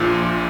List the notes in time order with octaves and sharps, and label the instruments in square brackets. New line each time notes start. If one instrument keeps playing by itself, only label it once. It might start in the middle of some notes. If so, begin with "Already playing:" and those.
Already playing: [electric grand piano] A#1 A#2 F3 D4 F4